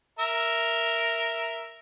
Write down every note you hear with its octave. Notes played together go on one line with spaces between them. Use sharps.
A#4 E5